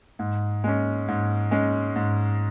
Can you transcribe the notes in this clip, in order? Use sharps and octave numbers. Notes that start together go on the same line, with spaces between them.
G#2
G#3 C#4
G#2
G#3 C#4
G#2